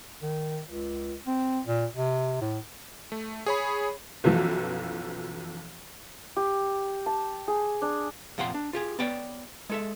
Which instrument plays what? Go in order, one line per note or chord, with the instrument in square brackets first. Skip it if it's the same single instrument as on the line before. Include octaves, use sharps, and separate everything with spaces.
[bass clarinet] D#3
C#2
C4
A#2
C3
A2
[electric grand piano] A3
G#4 C#5 B5
[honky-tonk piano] B1 F#2 E3 F3
[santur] G4
A5
G#4
D4
[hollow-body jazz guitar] F2 A#2 F#5 G5 C6
D4
F4 G4 G#4
B3 C#5 D5 G5
G#3 A4 E5